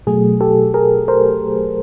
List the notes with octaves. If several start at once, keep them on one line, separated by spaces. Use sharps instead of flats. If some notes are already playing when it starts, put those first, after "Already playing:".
B2 F#3 A3 G#4
G4 A4
G#4 A#4
A#4 C5